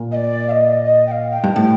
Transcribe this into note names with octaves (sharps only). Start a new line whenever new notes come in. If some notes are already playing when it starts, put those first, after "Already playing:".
Already playing: A#2
D#5
D5
F5
D#5
D#5
G5
F5
G5
G2
A2 G5